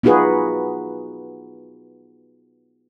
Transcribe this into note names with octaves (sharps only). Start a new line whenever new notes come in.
B3 D#4 F4 F#4 G#4 B4